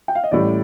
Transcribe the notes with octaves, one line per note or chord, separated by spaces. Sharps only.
G5
F5
D#5
A1 A2 G3 D5